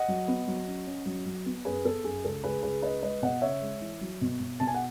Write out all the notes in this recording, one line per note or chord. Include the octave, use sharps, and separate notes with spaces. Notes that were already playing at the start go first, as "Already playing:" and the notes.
Already playing: D#5 F#5
F#3
B3
F#3
C#4
C#4
F#3
F#3
B3
F#2 G#4 B4
B3 A4
F#2 G#4
C#2 A4
C#2 G#4 B4
C#2 G#4 B4
C#4 B4 D#5
G#3 B4 D#5
B2 D#5 F#5
C#3 C#5 E5
G#3
E3
F#3
B2
B2
B2 A5
G#5
F#5